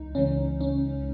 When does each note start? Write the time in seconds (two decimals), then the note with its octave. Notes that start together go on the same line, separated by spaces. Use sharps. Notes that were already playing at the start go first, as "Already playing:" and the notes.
Already playing: C#2 E3 G#3 D#4
0.15 C#2 C#3 E3 G#3 C#4
0.61 C#4